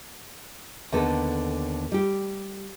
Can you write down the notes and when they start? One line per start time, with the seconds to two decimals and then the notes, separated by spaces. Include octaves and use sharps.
0.92 D#2 D3 B3 A4
1.92 G3 G4